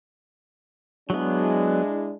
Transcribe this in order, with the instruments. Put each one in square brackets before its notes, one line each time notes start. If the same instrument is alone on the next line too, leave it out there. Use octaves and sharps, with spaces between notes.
[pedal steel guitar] F#3 B3 [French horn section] G#3 D4 E4